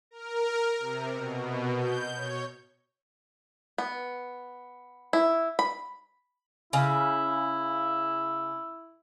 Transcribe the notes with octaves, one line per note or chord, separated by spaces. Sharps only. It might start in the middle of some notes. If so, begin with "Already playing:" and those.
A#4
C3
B2
G6
C#5
B3
E4
B5
C#3 E4